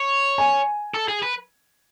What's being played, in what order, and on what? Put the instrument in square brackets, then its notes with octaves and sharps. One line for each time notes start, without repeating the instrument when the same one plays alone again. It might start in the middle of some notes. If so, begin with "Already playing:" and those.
Already playing: [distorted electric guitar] C#5
[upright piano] G#5
[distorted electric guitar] A4
G#4
B4